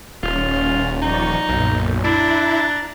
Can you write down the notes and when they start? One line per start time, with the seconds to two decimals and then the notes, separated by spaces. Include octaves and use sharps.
0.23 D#1 C#4 F4
1.02 F3 D#4 D5 C#6
1.49 B1 F#2 A#2
2.04 D4 E4 A#5 F#6 A6